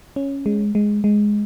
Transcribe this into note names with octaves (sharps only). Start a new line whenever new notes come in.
C#4
G#3
G#3
G#3